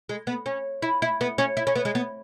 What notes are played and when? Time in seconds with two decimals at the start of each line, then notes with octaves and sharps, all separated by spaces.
0.09 G#3
0.27 B3
0.46 C#4
0.82 E4
1.02 E4
1.21 B3
1.38 C#4
1.57 E4
1.67 C#4
1.76 B3
1.85 G#3
1.95 B3